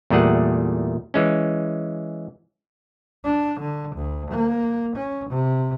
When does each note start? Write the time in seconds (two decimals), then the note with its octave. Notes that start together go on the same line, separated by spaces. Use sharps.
0.10 E2 A#2 G3 A3 G#4 F#5
1.14 E3 G#3 C#4
3.24 D4
3.61 D3
3.96 D2
4.31 A#3
4.96 C#4
5.30 C3